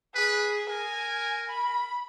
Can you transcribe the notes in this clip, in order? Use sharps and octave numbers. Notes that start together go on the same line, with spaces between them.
G#4 B4
A#4 G#5
B5